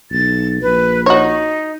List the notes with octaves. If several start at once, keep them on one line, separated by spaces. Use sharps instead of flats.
B1 A6
A#1 B4
D#4 F#4 C#5